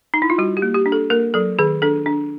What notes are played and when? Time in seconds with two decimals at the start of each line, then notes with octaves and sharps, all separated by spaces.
0.14 D#4
0.22 E4
0.30 F4
0.38 G3 F#4
0.57 G4
0.62 A#3
0.75 G4
0.86 D4
0.92 A4
1.10 A#3 A#4
1.34 F#3 A4
1.59 D#3 G#4
1.82 D4 A4
2.06 D4